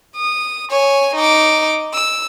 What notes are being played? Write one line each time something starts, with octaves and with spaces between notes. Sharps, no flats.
D#6
C#5 G#5
D#4 D6
E6